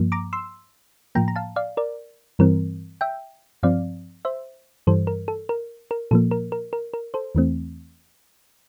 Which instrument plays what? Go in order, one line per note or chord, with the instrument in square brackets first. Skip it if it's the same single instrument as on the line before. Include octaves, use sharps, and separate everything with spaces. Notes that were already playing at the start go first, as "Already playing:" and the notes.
Already playing: [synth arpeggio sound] G2 F3 A#3
A#5 D6
C6 E6
A2 F3 A#3 G5 A#5
A#5
F5 A5
D5 F5
A#4 D5
G2 E3 G3 C4 A#4
E5 G5
G2 F3 C4 D5 F5
C5 E5
G2 E3 G3 A4 C5
A#4
A4
A#4
A#4
A#2 F3 A#3 A4
A#4
A#4
A#4
A#4
A4 C5
E2 E3 A3 C4